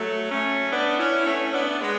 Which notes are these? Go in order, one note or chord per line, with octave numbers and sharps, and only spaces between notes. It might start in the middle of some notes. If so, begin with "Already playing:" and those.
Already playing: F#3 A3
A3 C#4
B3 D4
C#4 E4
A3 C#4
B3 D4
G#3 B3